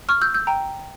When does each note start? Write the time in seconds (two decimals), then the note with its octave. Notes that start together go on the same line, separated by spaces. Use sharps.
0.09 C#6 F6
0.21 E6 G6
0.34 E6 G6
0.47 G5 A#5